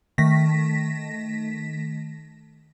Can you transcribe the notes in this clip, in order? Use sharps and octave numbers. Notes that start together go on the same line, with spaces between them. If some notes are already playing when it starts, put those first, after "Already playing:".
D#3 A3 A#6 B6